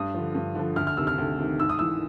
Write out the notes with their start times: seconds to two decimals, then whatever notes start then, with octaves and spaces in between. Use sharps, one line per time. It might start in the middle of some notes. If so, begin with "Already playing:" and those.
Already playing: G2 D#6
0.14 D3 F3
0.35 G2
0.55 D3 F3
0.76 D2 F6
0.87 F6
0.97 C3 D#3 E6
1.07 F6
1.18 D2
1.39 C3 D#3
1.59 G#2 E6
1.69 D#6
1.79 E3 E6